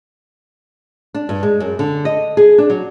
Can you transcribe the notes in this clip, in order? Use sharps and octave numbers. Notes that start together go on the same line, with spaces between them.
D4
G2
G#3
F#2
D3
D#5
G#4
D4
F#3